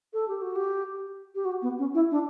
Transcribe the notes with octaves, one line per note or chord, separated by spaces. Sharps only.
A4
G4
F#4
G4
G4
F#4
B3
C#4
E4
D4